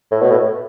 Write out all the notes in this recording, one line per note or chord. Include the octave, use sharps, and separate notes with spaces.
A2
B2
A2